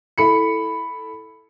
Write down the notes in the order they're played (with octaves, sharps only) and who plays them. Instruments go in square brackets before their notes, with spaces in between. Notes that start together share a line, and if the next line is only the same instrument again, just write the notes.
[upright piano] E4 A4 B5 C#7